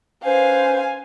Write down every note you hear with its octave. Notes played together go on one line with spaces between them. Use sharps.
C#4 B4 C5 F5 G#5